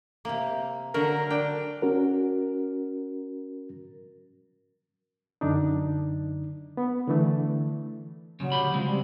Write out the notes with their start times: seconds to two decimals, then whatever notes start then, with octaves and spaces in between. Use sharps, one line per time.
0.25 C3 A#3
0.94 D3 F#3 A#4
1.30 D4 G5
1.82 C#4 F#4 A#4
5.41 F#2 D3 D4 D#4
6.77 B3
7.08 D3 E3 A3
8.40 A#2 C#3 F#3
8.52 D2 G4 B5
8.74 C#3 F3 G#3 C4
8.86 G3